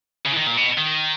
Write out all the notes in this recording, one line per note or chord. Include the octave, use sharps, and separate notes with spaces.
C#3
E3
D#3
A#2
B2
D#3